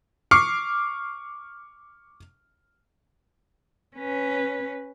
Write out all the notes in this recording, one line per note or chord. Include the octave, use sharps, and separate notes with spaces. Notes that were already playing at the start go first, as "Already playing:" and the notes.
C#6 D6 F6 C7 C#7
C#4 B4